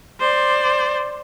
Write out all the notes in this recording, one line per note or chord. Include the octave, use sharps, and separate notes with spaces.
C5 D5